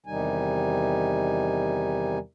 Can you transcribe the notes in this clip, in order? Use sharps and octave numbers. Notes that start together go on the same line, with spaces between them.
E2 C3 D#3 G3 D#4 G#5